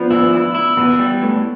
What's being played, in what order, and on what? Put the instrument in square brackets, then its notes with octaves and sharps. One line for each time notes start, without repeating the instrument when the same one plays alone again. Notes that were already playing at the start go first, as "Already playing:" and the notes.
Already playing: [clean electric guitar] F3 [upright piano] B3 D4
[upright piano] B3 [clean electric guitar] E4
[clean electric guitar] E4
E4
[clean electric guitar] E3 [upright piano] B3
[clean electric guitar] G3
A2